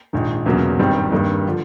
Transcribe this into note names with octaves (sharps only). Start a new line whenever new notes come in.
A#1 G#2 D#3
E1 E2 C#3 F#3 A#3
G#1 G2 D#3 G3 C4
G2 D#3 G3 A#3
D3 F3